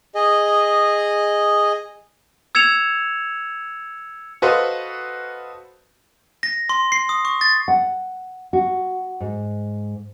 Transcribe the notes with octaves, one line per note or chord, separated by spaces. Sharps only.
G#4 D#5
E6 G#6 C#7 E7 F7
F#4 A4 B4 C5 D#5 F5
A#6
C6
C7
D#6
C#6
A6
F#5
F#4
G#2